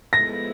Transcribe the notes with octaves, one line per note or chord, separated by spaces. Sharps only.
F3 G#3 B3 E4 A4 A#6